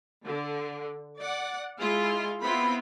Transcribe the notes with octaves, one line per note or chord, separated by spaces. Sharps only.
D3
D5 F#5
G#3 E4 F4
B3 C4 E4 F4 B5